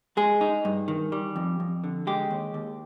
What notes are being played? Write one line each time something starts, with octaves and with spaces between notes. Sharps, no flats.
G#3 G#4
D#4
G2
D#3
G3
F2
F2
D3
G#3 G4
D#2
D#2